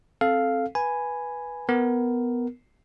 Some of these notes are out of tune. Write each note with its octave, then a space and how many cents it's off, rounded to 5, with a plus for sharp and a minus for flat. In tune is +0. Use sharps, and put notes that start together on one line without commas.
C4 +15 A4 -10 F5 +0
B4 -10 G#5 +0 B5 +0
B3 +5 A#4 +0